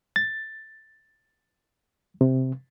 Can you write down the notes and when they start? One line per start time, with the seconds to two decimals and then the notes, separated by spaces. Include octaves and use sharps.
0.16 A6
2.21 C3